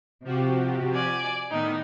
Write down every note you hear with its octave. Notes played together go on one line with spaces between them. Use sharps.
C3 F3 F#4 G4
D5 G#5
A2 D#3 B3 D#4